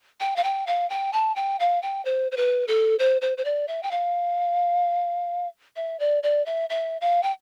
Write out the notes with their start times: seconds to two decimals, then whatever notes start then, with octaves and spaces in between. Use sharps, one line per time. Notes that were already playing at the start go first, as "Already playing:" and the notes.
0.20 G5
0.36 F5
0.44 G5
0.67 F5
0.90 G5
1.13 A5
1.36 G5
1.60 F5
1.83 G5
2.05 C5
2.32 C5
2.37 B4
2.68 A4
2.99 C5
3.22 C5
3.38 C5
3.45 D5
3.68 E5
3.83 G5
3.91 F5
5.76 E5
6.00 D5
6.23 D5
6.46 E5
6.70 E5
7.01 F5
7.23 G5